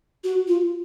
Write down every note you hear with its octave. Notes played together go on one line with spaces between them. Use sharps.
F#4
F4